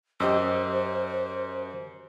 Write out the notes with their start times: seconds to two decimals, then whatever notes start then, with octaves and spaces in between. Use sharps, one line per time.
0.20 F#2 G4 C5 D#5 E6